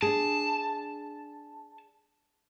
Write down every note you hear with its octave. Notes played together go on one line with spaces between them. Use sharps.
D4 G#4 A5